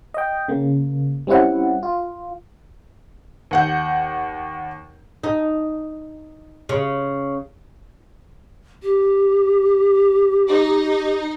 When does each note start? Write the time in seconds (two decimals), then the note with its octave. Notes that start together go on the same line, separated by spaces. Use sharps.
0.14 D#5 G5
0.48 C#3 A#3
1.27 G3 C4 C#4 E4 F#5
1.83 F4
3.51 D#2 F#5 G6
5.24 D#4
6.69 C#3
8.83 G4
10.48 D#4